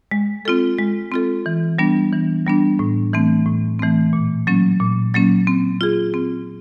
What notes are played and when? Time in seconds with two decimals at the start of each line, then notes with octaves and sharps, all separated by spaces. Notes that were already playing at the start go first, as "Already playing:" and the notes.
0.11 G#3
0.45 C4 F4 A4
0.78 G#3
1.12 C4 F4 A4
1.46 E3
1.79 G3 B3 D4
2.13 E3
2.46 G3 B3 D4
2.79 A2
3.13 E3 A3 C4
3.46 A2
3.79 E3 A3 C4
4.13 A#2
4.47 F#3 A#3 C#4
4.80 A#2
5.14 F#3 A#3 C#4
5.47 C4
5.81 F4 G#4
6.14 C4